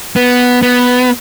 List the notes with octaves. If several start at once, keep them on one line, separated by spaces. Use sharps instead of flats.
B3
B3